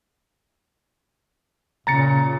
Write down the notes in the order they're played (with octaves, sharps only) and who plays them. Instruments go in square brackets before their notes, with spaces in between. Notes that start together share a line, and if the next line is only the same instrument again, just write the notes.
[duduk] A#2 [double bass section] C#3 [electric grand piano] A#5 A6 C#7